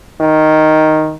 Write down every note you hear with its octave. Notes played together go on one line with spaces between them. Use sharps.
D#3